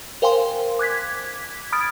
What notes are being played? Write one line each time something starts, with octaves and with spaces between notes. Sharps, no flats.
A#4 C5 F5 G5 G#5 C6
D6 F#6 G#6 B6
B5 D#6 F6 G#6 A6 D7